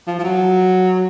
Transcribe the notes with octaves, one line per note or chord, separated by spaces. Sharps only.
F3
F3
F#3